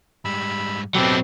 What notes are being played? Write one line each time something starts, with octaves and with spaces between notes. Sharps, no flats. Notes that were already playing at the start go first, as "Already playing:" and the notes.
G#2 G3 B5 E6
B2 F#3 C4 G4 A4 B4